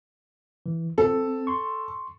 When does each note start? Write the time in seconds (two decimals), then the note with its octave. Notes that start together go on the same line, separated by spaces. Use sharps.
0.66 E3
0.98 C4 A4
1.47 C6 C#6